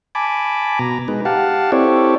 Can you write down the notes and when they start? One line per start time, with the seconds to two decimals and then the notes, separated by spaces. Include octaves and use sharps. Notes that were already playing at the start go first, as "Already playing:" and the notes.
0.15 G#5 A5 B5 D6
0.79 B2 A#5
1.08 G#3 D#4 B4
1.25 G4 F5 F#5 A5
1.72 C4 E4 G4 A4 C#5 D5